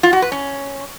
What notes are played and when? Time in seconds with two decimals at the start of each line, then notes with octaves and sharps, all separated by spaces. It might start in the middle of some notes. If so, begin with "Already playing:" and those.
0.03 F4
0.13 F#4
0.22 B4
0.32 C#4